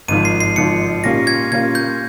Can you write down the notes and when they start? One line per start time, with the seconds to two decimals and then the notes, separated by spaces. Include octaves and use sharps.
0.08 G#1 G#2 F3 D#7
0.25 C7
0.41 C7
0.56 G#1 G#2 F3 C#7
1.04 A#2 G3 A#3 C#4 F4 A#6
1.27 G#6
1.51 A#2 G3 A#3 C#4 F4 G#6
1.75 G6